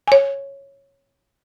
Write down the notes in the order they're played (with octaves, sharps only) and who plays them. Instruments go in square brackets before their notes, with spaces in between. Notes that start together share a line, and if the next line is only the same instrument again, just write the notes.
[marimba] C#5 G#5